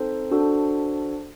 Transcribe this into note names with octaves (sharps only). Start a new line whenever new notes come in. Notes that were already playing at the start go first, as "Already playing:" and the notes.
Already playing: C4 D#4 A4 C5
D4 F#4 A4